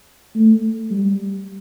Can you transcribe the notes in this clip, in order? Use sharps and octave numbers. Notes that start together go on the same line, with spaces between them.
A3
G3